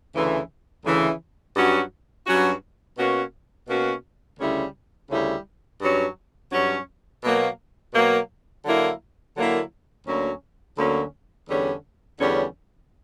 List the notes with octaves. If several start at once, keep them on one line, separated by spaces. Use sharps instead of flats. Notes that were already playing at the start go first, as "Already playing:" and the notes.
D2 C#3 E3
D2 C#3 E3
G2 F#3 C#4 F#4
G2 F#3 C#4 F#4
B2 A#3 C#4 F#4
B2 A#3 C#4 F#4
D2 C#3 G3 C#4 E4
D2 C#3 G3 C#4 E4
G2 F#3 C#4
G2 F#3 C#4
B2 F#3 A#3
B2 F#3 A#3
D3 F#3 A#3 E4
D3 F#3 A#3 E4
D2 D3 F#3 A#3 C#4
D2 D3 F#3 A#3 C#4
E2 D3 G3 C#4
E2 D3 G3 C#4